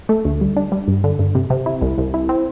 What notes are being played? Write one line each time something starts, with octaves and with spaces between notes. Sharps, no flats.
A3
D2
G3
D4
G3
G2
D3
G2
C3
C3
E4
C2
C2
E4
C4